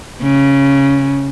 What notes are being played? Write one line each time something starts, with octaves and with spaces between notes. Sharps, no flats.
C#3